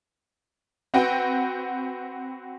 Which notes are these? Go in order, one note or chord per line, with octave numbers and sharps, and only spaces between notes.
C4 F#4 B4 G5